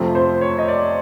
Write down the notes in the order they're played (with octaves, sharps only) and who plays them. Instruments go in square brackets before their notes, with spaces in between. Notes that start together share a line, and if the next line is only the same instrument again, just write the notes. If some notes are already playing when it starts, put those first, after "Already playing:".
Already playing: [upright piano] F2 C3 F3 A3 C4
C5
C#5
D#5
D5